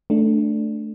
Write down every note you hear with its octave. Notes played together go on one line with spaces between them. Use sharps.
A3 D4